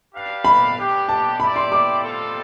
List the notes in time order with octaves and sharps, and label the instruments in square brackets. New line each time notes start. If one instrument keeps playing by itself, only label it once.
[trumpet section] D4 G4 B4 F5
[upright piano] B5
[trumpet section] B3 D4 G4
[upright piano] A5
[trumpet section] E4 G4 D5 G5 [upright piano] B5
[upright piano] C6
D6
[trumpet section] G3 C4 F4 A4